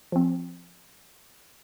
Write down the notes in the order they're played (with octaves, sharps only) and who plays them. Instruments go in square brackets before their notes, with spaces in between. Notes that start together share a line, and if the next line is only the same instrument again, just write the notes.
[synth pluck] F3 C4